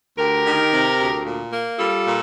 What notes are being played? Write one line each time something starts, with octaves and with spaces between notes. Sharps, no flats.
D2 G4 A#4
D#3
C3
D2
A#2
A#3
G3 F4 A4
A#2